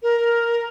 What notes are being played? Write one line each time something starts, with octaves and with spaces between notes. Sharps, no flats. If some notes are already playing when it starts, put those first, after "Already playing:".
A#4